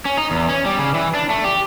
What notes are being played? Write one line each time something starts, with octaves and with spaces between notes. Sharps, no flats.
C#4
D#4
E2
C#4
G3
C#3
E3
D4
A3
G4